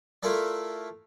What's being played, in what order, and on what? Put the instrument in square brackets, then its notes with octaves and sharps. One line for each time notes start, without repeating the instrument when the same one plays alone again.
[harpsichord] A3 E4 F4 A4 A#4 D5